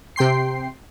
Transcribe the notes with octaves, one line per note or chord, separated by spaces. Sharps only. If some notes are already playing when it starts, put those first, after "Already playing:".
C3 G5 C6 C7